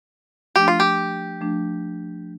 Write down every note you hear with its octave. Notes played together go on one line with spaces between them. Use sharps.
F3 A3 D4 G4
F4
G4
F3 A3 D4